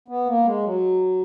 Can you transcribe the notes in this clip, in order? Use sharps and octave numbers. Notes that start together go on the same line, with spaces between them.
B3
A#3
G#3
F#3